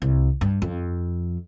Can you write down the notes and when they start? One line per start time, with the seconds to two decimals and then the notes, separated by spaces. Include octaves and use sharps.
0.02 C2
0.41 G2
0.62 F2